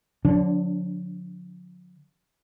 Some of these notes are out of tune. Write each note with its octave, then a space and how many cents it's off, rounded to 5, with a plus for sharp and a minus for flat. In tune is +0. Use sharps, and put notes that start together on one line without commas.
D3 +0 F#3 -45 D4 -30